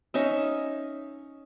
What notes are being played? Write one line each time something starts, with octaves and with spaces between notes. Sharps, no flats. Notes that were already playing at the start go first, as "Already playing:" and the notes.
C#4 D#4 E5